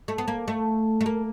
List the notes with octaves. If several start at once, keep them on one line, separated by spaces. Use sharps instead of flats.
A3
B3
A#3
A3
A3
A#3